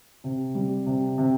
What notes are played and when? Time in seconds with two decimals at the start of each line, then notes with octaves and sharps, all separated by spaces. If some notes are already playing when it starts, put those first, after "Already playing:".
0.24 C3
0.55 G3
0.86 C3
1.18 C3